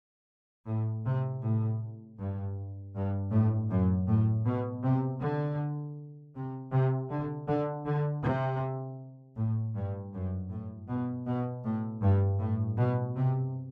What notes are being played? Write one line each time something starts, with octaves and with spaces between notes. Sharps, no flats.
A2
C3
A2
G2
G2
A2
F#2
A2
B2
C3
D3
C3
C3
D3
D3
D3
C3
A2
G2
F#2
A2
B2
B2
A2
G2
A2
B2
C3